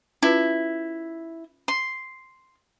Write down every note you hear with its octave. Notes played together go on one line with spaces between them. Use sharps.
C#4 E4 F4 B4
C6